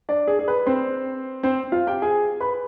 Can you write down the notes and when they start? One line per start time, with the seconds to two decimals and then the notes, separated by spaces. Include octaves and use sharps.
0.09 D4 D5
0.28 G#4
0.39 G#4
0.48 B4
0.66 C4 C5
1.43 C4 C5
1.72 F4 F5
1.87 G4 G5
2.02 G#4 G#5
2.40 B4 B5